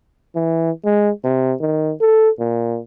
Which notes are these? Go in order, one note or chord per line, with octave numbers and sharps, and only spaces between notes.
E3
G#3
C3
D#3
A4
A#2